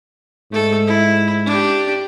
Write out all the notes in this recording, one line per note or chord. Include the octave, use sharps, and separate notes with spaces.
G#2 A3 A4
E4
D4 G4